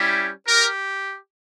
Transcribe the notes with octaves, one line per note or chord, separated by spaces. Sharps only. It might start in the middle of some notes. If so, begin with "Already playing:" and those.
Already playing: G3 C#4 E4 G4
G4 A#4